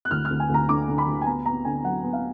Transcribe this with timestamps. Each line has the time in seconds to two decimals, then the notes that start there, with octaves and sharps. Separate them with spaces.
0.05 F#6
0.11 D2 F6
0.25 F6
0.31 D2
0.40 G#5
0.50 D2 A#5
0.69 D3 D6
0.88 D3
0.98 B5
1.07 D2
1.22 G#5
1.26 B3 A#5
1.46 B3 A#5
1.65 D3 G#5
1.84 F#3 F#5
2.03 B3
2.13 F5